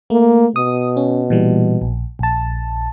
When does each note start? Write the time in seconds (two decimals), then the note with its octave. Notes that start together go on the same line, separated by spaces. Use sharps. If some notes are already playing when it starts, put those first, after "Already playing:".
0.10 A3 A#3
0.56 B2 D#6
0.97 C#4
1.30 A#2 E3 G3
1.81 A#1
2.19 A#1 A5